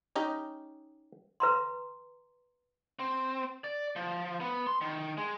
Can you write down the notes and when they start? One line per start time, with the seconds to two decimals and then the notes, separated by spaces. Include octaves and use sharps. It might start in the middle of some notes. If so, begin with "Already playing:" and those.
0.16 C#4 D#4 G4 D#5
1.40 B4 A#5 C6
2.99 C4
3.64 D5
3.96 F3
4.40 B3
4.67 C6
4.81 D#3
5.18 G#3